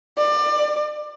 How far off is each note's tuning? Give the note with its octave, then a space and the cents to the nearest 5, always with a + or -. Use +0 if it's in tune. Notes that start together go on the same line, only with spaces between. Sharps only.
D5 +25